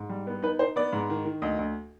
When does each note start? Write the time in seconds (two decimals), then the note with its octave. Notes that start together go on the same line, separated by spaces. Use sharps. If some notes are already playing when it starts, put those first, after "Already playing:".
Already playing: G#2
0.09 G3
0.27 B3
0.43 D#4 B4
0.59 D#4 C5
0.76 B3 D5
0.93 G#2
1.10 D#3
1.25 D#3
1.42 D2 D#5
1.59 D2